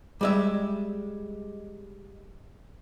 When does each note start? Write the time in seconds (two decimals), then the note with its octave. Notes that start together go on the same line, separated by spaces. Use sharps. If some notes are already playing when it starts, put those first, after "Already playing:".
0.21 G3 G#3 E5